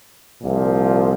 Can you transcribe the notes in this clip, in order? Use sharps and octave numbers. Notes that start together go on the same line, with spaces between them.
C2 A#2 F3